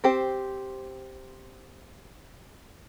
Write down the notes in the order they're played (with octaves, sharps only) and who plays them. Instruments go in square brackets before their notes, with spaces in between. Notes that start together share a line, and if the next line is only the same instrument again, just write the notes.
[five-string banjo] C4 G4 C5